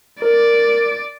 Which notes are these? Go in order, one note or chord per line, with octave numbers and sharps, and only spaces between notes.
A#4 D5